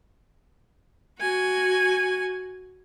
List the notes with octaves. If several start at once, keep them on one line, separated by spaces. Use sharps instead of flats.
F#4 G#5